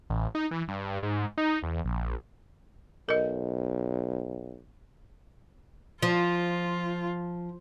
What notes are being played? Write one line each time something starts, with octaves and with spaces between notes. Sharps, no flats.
A1
D#4
E3
G2
G#2
D#4
E2
A#1
B1 A#4 D#5
F3 F4